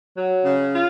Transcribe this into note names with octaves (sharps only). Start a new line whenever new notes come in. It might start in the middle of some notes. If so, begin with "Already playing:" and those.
F#3
C#3
F4